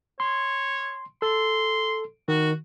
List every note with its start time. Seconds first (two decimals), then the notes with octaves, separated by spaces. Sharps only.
0.20 C#5 C6
1.22 A4 C6
2.28 D#3 F#4